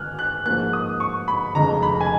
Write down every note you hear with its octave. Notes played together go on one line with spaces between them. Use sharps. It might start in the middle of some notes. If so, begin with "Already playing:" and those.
Already playing: G#2 D#3 G#5 F6 F#6
F#6
G#2 F3 A#3 F#6
D#6
C#6
B5
F1 F2 C#3 G#3 A#5
B5
G#5